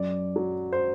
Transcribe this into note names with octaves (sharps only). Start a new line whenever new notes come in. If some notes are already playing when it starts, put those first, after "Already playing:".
Already playing: F#2 D5
F#3
C5